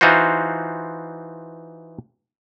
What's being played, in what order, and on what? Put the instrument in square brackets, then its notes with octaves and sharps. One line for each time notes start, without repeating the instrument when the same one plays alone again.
[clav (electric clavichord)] E3 D#4 F4 F#4 C5